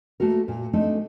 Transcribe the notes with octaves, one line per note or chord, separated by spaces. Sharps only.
A3 A#3 F#4 A#4
A#2
A3 C4 D4 D#4 A4